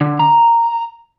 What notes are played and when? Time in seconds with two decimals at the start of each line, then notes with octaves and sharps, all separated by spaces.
0.01 D3
0.19 A#5